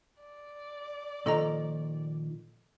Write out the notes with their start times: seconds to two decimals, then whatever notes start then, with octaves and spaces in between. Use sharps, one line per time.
0.20 D5
1.26 A#2 D#3 F3 A4 D#5 A#5